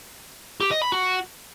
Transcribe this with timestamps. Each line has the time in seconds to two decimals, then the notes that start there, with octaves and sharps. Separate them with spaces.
0.61 G4
0.71 D#5
0.82 B5
0.92 F#4